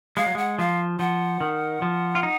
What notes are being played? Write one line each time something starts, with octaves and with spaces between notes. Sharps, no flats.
G#3 F5
F#3
G#3 F#5
F3 F5
F3 F#5
D#3
F3
F4
D#4